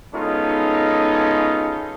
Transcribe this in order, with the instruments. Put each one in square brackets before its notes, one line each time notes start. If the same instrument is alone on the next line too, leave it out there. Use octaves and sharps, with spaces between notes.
[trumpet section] G#3 B3 C#4 D#4 F4 A4